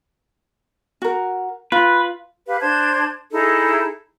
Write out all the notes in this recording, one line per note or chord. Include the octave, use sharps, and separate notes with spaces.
F#4 A#4
F4 B4
G4 B4 F5
D4 C5 A5 G#6
D#4 E4 G#4 A4